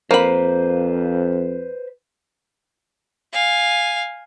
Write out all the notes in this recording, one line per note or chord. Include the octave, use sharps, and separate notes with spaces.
F2 A#3 B4 C5 B5
F5 G#5